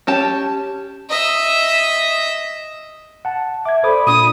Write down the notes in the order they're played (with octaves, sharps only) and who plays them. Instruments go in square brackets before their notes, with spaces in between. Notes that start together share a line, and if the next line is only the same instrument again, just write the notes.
[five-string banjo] C#4 G4 A5
[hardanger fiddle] D#5 E5
[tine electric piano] F#5 A5
[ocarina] E5 [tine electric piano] D6 G#6
[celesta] A4 D5 [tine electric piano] C5 D6 D#6 [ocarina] B5
[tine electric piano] A#2 [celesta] D4 D#7 [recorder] D#6